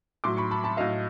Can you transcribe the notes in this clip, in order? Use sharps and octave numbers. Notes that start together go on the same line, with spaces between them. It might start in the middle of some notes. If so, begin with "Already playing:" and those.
A2 F#3 C6 D6
B5 C#6
A5 B5
A5 B5
A2 F#3 D#5 F5